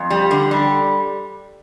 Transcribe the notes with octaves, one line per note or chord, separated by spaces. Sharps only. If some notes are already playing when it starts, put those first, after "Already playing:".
Already playing: F2
G3
D3
G3